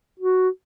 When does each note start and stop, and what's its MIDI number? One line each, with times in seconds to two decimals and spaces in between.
0.20 0.49 66